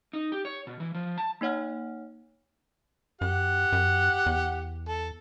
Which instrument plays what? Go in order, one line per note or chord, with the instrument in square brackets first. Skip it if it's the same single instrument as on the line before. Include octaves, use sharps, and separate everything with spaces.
[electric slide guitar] D#4
G4
C#5
B2
E3
F3
A5
[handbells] A#3 D#4 C#5 F#5 F6
[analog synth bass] F#2 [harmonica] G4 F#5
[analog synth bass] F#2
E2
[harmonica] A4